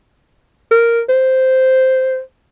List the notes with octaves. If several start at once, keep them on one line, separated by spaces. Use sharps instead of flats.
A#4
C5